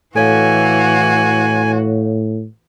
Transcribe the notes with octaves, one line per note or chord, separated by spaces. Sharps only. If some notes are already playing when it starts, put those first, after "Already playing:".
A2 E3 F#4 A4 C#5 F5 G#5